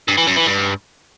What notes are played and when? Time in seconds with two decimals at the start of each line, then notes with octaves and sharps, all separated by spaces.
0.08 G2
0.18 E3
0.27 F#2
0.37 E3
0.46 G2